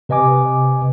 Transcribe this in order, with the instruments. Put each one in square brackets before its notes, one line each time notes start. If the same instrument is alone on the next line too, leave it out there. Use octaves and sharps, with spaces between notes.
[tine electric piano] C3 B4 D#5 G#5 D6